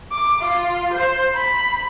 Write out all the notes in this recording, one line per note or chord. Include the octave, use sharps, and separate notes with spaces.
D6
F4
C5
B5